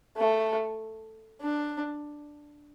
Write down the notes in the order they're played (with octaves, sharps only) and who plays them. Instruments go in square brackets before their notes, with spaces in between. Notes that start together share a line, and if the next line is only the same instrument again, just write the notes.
[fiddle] A3
D4